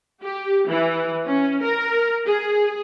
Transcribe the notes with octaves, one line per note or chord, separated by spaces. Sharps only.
G4
E3
C#4
A#4
G#4